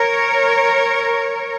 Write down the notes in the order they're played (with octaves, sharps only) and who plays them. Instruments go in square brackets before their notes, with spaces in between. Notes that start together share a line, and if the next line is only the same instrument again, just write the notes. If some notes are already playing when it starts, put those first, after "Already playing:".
Already playing: [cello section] A#4 C#5